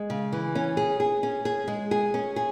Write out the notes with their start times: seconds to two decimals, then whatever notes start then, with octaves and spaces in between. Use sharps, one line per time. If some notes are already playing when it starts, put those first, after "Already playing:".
Already playing: G#3
0.10 C#3
0.32 E3
0.55 C#4
0.77 G#4
1.00 G#4
1.23 C#4
1.45 G#4
1.68 G#3
1.91 G#4
2.14 C#4
2.36 G#4